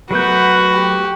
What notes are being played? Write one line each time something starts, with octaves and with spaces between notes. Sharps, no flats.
F#3 A3 B3 F#4 A#4 B4 G6
G4